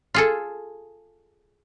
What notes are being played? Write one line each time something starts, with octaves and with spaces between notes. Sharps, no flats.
F4 G#4 A4